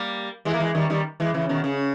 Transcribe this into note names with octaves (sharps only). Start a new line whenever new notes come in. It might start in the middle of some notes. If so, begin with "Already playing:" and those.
Already playing: G3 A#3
E3 G#3
A#3
E3 G#3
D#3 G3
D#3 G3
E3 G#3
C#3 E3
B2 D#3
C#3